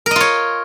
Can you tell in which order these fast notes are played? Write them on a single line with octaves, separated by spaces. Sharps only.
A#4 D#5 F4 C#5